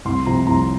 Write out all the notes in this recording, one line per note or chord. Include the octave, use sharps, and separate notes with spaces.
C2 C6
C3 F3 A#5
C2 A#5